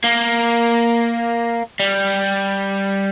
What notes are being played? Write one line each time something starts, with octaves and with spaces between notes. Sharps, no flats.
A#3
G3